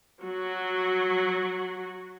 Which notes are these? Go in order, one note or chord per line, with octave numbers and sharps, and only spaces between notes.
F#3 F#4